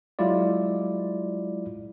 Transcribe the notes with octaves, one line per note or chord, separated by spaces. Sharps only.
F#3 G#3 E4 F4 D5